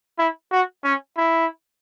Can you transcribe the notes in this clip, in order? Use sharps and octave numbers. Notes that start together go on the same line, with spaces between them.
E4
F#4
C#4
E4